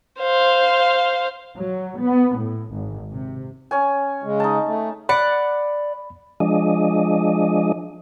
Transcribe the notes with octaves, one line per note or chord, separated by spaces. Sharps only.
C5 F5
F#3
B3
A2
G#1
C3
C#4 C#5 G#5
C#3 G#3
D#4 A5
A3
D5 F#5 B5
F3 G#3 D4 D#5